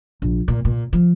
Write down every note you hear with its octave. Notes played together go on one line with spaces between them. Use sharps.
A#1
A#2
A#2
F3